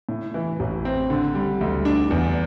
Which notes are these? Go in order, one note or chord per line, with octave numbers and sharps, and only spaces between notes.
A2
E3
A1
C4
D3
G3
D2
D4
E2